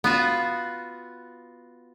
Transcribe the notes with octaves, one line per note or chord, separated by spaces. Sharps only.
B3 F4 F#4